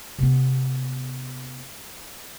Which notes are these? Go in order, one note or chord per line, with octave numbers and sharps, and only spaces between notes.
C3 B3